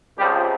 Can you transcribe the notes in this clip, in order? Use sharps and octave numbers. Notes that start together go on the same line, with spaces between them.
C#2 C3 F3 G3 G4